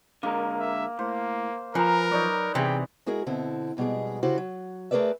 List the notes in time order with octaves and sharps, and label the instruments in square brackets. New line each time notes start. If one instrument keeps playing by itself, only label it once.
[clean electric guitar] D3 G#3 A#4 [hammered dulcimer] A#3
[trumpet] E5
[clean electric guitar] A2 [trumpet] A#3 [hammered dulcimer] C5
[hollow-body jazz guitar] F3 [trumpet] A#4 [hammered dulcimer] B4 [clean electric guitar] G#5 A#5
[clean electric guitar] F#3 [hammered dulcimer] D#4 C#5 D5
[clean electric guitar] E2 G#4 [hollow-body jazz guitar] C3 E3 [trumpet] G5
[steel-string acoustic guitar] G#3 E4 F#4 G#4 A#4
B2 D3 C4 E4
F2 B2 G3 G#3 G#4
C#3 E4 F#4 G4 C5
F#3
A3 G#4 A#4 B4 D5 E5